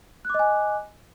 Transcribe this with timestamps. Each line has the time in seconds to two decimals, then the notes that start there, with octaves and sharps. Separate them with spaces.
0.25 F#6
0.30 D6
0.34 D#5
0.39 G#5